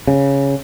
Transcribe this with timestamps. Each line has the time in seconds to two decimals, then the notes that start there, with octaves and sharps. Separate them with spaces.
0.07 C#3